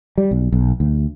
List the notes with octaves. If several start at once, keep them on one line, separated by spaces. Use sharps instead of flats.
G3
B1
B1
D2